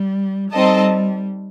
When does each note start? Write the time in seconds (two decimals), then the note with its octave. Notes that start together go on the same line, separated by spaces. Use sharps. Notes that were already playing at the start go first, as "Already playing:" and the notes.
Already playing: G3
0.51 G3 C4 D#4 A4 D#5 A5